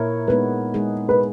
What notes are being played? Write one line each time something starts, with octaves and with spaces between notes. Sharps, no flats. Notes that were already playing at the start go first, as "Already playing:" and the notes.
Already playing: A#2 A#3 E4 A#4 C#5
G#3 B3 D#4 B4
G#3 D#4 G#4
B4